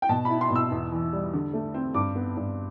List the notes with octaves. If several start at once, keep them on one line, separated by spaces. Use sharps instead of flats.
G5
B2 A5
B5
E4
C6
B2
E6
E2
E3
G3
D3
A3
C4
G2 D6
B3
G2